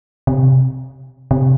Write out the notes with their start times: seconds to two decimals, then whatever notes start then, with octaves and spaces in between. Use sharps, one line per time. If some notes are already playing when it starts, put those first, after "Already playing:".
0.27 C3
1.31 C3